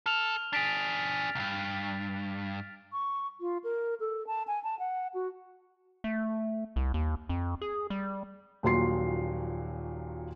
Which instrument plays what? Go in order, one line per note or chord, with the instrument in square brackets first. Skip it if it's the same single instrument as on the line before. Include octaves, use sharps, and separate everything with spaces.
[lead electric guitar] A4 [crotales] F6 F7
[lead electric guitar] D4 G#4 [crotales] A6 B6 D7
[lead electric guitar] C2 G2
[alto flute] C#6
F4
A#4
A4
A5
G#5
A5
F#5
F#4
[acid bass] A3
C2
D#2
F2
G#4
G3
[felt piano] D#1 A#2 F#3 C6 C7